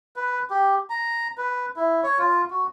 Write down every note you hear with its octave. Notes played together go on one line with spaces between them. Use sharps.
B4
G4
A#5
B4
E4
C#5
F4
F#4